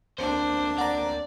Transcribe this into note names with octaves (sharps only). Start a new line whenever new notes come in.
D2 A#3 C4 D4 C5
D5 F#5 A#5